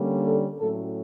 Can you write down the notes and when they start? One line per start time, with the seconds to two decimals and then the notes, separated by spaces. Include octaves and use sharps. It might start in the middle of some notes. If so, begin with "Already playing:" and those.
Already playing: D3 G3 A#3 C#4
0.24 A4
0.60 A2 F#3 A3 C#4 A4